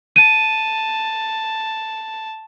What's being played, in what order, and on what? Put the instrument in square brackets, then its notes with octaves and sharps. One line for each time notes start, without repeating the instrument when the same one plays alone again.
[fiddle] A5 [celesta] D#7